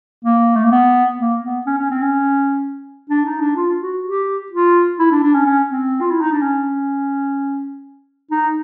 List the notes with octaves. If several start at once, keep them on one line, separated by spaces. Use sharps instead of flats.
A#3
A3
A#3
B3
A#3
B3
C#4
C#4
C4
C#4
D4
D#4
D4
F4
F#4
G4
F4
E4
D4
D4
C#4
C#4
C4
F4
E4
D#4
D4
C#4
D#4